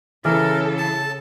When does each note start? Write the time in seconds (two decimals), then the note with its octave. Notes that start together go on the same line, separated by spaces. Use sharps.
0.25 C#3 E3 A4 A#4
0.78 A5